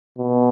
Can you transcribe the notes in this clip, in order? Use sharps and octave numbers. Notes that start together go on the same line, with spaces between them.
B2